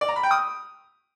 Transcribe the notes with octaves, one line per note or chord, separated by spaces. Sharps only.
D5
A#5
B5
G5
D#6